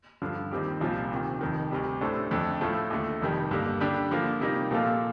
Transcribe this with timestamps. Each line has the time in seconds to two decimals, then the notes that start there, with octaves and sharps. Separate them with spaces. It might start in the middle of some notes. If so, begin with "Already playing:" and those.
0.22 G2 D3 F3
0.51 D#2 D#3 G3 C4 G4
0.81 C2 A#2 F3 C4 F4
1.12 D2 C3 D#3
1.41 F1 F2 D#3
1.71 D2 C3 G3
2.01 A2 A3 D4 A4 C5
2.31 F2 D3 A3
2.61 A2 F3 A3
2.90 D#2 D3 A3
3.21 F1 F2 D#3 G3
3.51 G2 D3 G3 A#3
3.80 D3 G3 D4 G4
4.11 D3 F3 A#3
4.40 C3 G3 A#3 D#4
4.71 A#2 F3 A#3 F4 A4